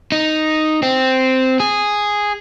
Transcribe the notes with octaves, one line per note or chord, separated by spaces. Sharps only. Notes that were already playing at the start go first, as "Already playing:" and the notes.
D#4
C4
G#4